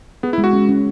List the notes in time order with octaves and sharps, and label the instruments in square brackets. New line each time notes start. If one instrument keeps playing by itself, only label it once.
[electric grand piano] B3 [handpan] G#4
[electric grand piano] E4
[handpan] G#3
[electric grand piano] F#4
[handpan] C#4
C#4